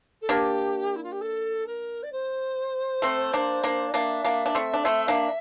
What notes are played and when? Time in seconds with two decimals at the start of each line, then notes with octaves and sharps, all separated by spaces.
0.21 A4
0.28 A#3 D4 G4
0.95 E4
1.03 F4
1.11 G4
1.20 A4
1.66 A#4
2.02 D5
2.12 C5
3.02 A3 C4
3.33 A#3 D4
3.64 A#3 D4
3.93 A#3 D4 E5
4.25 A#3 D4
4.46 D4
4.55 A3 C4
4.74 D4
4.85 A3 C4
5.08 A#3 D4